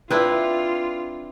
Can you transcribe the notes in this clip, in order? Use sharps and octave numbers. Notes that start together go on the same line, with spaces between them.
C4 D4 E4 F4 B4